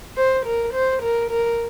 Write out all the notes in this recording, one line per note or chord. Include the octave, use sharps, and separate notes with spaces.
C5
A#4
C5
A#4
A#4